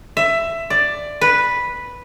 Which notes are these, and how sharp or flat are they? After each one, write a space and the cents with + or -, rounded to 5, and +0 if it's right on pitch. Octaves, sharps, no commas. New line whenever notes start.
E5 +15
D5 +10
B4 -5